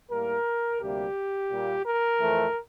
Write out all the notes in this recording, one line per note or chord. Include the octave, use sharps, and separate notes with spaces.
A2 G3 A#3 A#4
D2 C3 G3 A#3 G4
A#2 G3 A#3
A#4
F2 E3 A3 C4